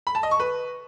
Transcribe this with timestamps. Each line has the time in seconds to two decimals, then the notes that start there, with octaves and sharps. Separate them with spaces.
0.07 B5
0.15 A5
0.23 D#5
0.31 C#6
0.40 B4